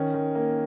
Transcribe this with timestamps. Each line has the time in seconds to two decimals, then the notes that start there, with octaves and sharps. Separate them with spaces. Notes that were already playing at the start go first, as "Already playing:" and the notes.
Already playing: D#3 C#4
0.14 D#3
0.35 A#3